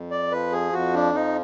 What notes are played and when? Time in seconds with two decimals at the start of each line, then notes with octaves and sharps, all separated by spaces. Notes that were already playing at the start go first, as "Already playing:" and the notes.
Already playing: F2
0.11 D5
0.32 F3 B4
0.52 G#4
0.73 F2 F#4
0.94 D4
1.14 F3 D#4